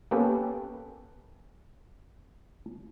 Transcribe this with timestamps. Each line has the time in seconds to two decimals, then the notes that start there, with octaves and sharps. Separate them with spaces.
0.11 A#3 B3 C#4 G4 A4 B4